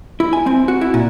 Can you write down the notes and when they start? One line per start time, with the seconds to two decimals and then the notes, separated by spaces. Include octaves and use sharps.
0.20 E4
0.33 G#5
0.46 C4
0.68 F#4
0.81 E4
0.94 A#2